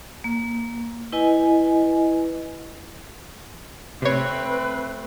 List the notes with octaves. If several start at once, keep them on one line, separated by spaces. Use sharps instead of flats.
A#3
E4 B4 D#5 G#5
C3 A3 C4 B4 C#5